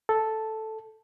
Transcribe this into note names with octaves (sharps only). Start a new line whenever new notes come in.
A4